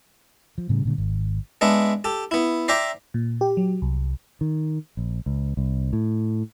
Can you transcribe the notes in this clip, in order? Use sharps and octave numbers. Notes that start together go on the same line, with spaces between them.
F3
A2 C#3 G3
A#2 D3 G3
G#1
G#3 B3 D4 E5
G4 A4
B3 E4
C5 D5 E5 G5 A#5 D6
A#2
G4
F#3
C2
D#3
A#1
C#2
C2
A2